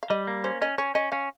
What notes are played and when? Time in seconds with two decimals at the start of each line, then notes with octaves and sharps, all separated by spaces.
0.03 F5
0.10 G3 D#5
0.27 A#3
0.44 C#4 C5
0.62 C#4 D#5
0.78 C#4 C#5
0.95 C#4 D#5
1.12 C#4 F5